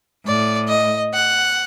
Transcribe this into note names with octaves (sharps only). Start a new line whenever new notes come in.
A2 D5
D#5
F#5